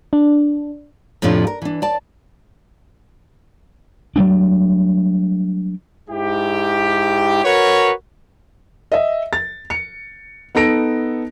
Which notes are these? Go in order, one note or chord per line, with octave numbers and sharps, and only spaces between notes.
D4
F2 A2 C3 F3 D4 F4
A#4
E3 D4
D5 A5
F#3 G3 A3 D4
G#2 E4 G4
F#4 A#4 B4 C#5
D#5 E5
A6
C#7
B3 D#4 A4 A#6 D7